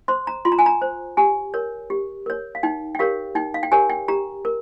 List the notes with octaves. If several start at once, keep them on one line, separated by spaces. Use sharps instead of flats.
C5 C6
A#5
F4 C6
A#5
G#5
A#5
C5
G4 G#5
A#4 C#5
G4
A#4 C#5
F5
D#4 G5
G5
G4 A#4 C#5 F5
D#4 G5
F5
G5
G4 A#4 C#5 G#5
G5
G4 A#5
A#4